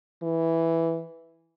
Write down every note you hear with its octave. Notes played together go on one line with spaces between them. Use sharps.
E3